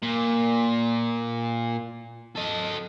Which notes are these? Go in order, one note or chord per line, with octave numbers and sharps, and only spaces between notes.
A#2
A4 D#5